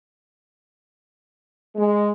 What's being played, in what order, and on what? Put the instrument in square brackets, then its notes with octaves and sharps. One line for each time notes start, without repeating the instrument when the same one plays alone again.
[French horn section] G#3